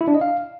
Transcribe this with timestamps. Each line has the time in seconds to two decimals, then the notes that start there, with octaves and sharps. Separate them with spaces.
0.01 E4
0.08 D4
0.15 D#5
0.21 F5